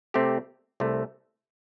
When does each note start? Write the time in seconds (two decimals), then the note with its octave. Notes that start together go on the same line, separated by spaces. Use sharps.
0.14 C3 A3 C4 G4
0.80 C2 C3 A3